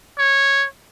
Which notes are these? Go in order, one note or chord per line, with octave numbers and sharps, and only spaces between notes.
C#5